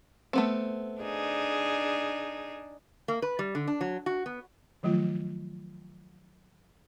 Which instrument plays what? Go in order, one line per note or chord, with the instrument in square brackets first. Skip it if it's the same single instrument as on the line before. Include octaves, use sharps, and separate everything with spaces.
[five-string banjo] A3 B3 C4
[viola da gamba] D4 D#4 G#4
[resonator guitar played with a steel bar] A#3
B4
G3
D3
D4
F#3
F#4
B3
[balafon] D#3 F3 F#3 A3 F4